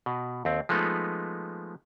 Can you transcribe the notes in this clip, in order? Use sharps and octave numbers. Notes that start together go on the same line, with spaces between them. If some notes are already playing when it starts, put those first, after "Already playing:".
B2
D#2 C4
F3 G#3 A3 B3 D#4